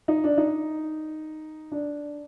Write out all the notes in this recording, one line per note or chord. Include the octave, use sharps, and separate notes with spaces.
D#4
D4
D#4
D4